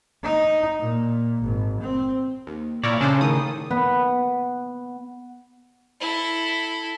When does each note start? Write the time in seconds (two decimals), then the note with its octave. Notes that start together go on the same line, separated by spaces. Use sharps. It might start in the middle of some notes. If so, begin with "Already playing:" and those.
0.23 D#4
0.79 A#2
1.42 G#1
1.81 C4
2.47 D#2
2.84 A#2 E4 A#4 C#5 D5
3.01 C#3 C#4 D4 A4 C5
3.21 A2 D#3 D#6
3.70 B3
6.01 E4 A4